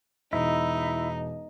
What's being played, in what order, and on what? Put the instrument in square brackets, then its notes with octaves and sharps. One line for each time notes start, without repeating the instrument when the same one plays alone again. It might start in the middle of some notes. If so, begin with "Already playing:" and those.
[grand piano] E1 [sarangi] D#4 [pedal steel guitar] E4